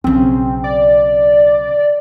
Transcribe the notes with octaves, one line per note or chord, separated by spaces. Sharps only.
B1 C#3 C4
D5